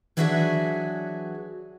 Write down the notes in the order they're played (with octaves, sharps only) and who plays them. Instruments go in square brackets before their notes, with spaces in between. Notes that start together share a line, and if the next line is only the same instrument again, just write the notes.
[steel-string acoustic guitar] E3 F#3 D4 F#4 G#4 E5